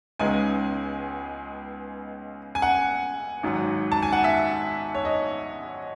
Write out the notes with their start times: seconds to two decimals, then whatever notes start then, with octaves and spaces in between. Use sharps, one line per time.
0.19 C#2 C#3 G#3 B3 D#4 G#5
2.55 G#5
2.62 F#5
3.43 G#1 G#2 F#3
3.92 A5
4.02 G#5
4.12 F#5
4.24 E5
4.95 C#5
5.05 D#5